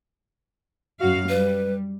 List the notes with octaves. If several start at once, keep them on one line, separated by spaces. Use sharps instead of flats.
F#2 F#4 F5
G3 B4